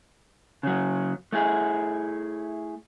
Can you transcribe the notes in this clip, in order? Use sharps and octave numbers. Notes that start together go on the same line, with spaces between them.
C#3 F#3
A3 E4 G#4